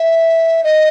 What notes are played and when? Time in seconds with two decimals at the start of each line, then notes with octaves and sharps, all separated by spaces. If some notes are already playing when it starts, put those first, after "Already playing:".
Already playing: E5
0.64 D#5